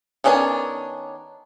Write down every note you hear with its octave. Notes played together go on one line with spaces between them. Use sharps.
D#3 B3 C#4 D4 G#4